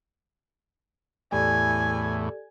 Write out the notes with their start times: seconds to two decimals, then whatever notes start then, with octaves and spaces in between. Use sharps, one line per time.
1.32 E2 A2 G4 A4 D5 G#5